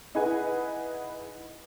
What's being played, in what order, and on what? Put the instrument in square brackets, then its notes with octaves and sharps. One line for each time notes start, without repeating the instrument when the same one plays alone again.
[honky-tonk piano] D#4 E4 G#4 B4 F#5 G#5